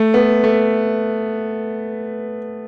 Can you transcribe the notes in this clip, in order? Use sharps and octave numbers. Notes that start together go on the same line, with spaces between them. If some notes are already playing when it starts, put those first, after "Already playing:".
Already playing: A3
B3
A3